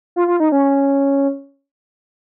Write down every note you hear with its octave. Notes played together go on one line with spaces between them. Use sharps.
F4
F4
D#4
C#4